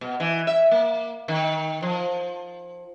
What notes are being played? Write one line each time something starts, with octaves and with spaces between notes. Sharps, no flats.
B2
E3
E5
A#3
D#3
F3